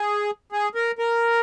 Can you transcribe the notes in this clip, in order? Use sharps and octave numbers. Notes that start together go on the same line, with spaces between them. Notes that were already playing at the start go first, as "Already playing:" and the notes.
Already playing: G#4
G#4
A#4
A#4